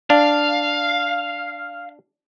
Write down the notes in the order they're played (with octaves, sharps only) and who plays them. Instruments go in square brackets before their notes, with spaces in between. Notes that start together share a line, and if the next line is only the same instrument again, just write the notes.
[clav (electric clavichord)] D4 [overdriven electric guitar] F5